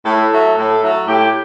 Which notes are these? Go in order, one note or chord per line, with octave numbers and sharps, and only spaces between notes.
A2 A4
F#3 A3
A2
F#3 A3
A2 G4